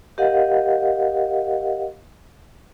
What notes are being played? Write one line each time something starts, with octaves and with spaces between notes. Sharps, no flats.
G4 A#4 D#5 F5 F#5